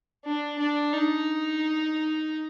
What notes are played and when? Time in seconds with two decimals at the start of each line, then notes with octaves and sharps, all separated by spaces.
0.25 D4
0.59 D4
0.93 D#4